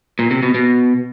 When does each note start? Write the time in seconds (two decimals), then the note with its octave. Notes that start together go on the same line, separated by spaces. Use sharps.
0.19 A#2
0.31 C3
0.43 B2
0.55 B2